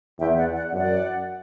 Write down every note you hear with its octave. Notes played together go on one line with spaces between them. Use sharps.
E2 E5 G5
D5 F#5
D5 F#5
F#2 D5 F#5